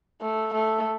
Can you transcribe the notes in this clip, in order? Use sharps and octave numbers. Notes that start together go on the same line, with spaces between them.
A3
A3